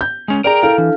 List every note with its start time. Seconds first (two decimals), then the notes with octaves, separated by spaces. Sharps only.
0.01 G6
0.28 G#3 C#4
0.44 G#4 A#4 D5 G5 A#5
0.63 E4 A4 F5 F6
0.78 E3 D4